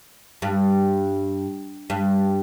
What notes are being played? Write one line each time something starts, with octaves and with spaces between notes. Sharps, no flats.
G2
G2